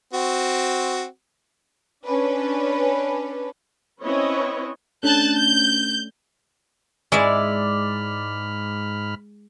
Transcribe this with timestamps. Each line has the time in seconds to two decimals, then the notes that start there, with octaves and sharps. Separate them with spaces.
0.13 C4 F#4
2.05 C#4 D4 B4
4.02 C4 C#4 E4 B4 C#5 D#5
5.03 A3 C#4 D4 A5 F#6 G6
5.33 G6
7.12 G#2 G#3 E4 D5 E5 B5 F6